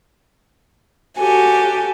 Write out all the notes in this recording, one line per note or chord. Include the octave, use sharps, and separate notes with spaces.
F#4 G4 A4 G#5